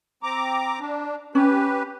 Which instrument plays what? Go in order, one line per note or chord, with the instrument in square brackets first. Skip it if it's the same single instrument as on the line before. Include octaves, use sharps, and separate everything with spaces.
[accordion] C4 A#5 D6
D4
[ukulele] C#4 [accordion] G4 B4